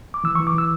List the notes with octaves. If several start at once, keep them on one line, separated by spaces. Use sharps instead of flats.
D6
E3 E6
C#6
E3
D6
E3 E6